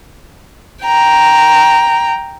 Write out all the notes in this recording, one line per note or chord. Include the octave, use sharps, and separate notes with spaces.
G5 A#5